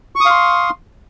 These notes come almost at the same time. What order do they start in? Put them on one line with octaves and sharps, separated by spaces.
C#6 D#6 F5 C6